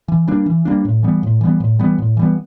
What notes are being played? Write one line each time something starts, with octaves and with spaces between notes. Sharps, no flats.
E3
G3 A#3 D4
E3
G3 A#3 D4
A2
E3 G3 B3
A2
E3 G3 B3
A2
E3 G3 B3
A2
E3 G3 B3